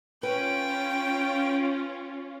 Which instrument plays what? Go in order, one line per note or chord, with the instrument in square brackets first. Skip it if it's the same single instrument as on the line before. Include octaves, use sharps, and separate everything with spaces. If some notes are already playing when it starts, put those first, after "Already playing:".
[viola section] C#4 F4 [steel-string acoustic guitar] B4 [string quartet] G5